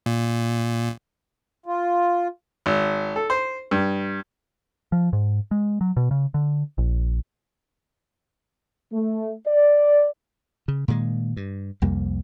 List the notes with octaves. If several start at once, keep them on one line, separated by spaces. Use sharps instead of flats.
A#2
F4
G#1
A4
C5
G2
F3
G#2
G#3
F#3
B2
C#3
D3
A#1
A3
D5
C#3
A#2 D#3 F#3 G#3
G2
C2 F2 G3 A#3